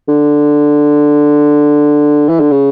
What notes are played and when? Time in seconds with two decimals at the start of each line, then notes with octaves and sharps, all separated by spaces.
0.08 D3
2.29 E3
2.40 D3
2.51 C#3